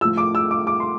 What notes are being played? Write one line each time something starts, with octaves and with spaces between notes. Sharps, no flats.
A2 F3 E6
D6
E6
D6
D6
C6